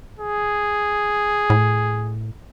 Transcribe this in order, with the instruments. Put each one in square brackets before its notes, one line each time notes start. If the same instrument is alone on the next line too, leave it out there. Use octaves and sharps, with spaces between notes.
[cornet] G#4
[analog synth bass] A2